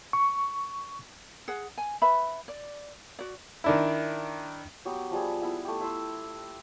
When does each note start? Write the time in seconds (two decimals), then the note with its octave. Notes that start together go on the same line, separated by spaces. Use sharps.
0.13 C#6
1.48 G#4 F#5
1.78 G#5
2.02 B4 E5 B5
2.48 D5
3.19 F#4 D5
3.64 D#3 D4 E4
4.85 F#3 B3 G4
5.11 F3 G3 G#4
5.42 B3 E4 A5
5.65 A3 G4
5.80 E4 C6 E6